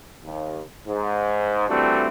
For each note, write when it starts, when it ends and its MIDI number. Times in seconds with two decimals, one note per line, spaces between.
0.24 0.61 39
0.86 1.68 44
1.68 2.08 52
1.68 2.08 55
1.68 2.08 57
1.68 2.08 60
1.68 2.08 62
1.68 2.08 66